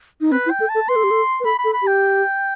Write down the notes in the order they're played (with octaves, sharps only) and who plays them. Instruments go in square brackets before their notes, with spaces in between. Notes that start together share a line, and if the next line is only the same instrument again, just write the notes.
[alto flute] D#4
[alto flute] C4 [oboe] B4
[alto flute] E4
[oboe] G5
[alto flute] A4
[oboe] A5
[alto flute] A4
[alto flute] B4 [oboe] C6
[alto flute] A4
G4
A4
B4
[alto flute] A4 [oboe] B5
[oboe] B5
[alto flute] A4
[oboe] B5
[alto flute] G4 [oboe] G5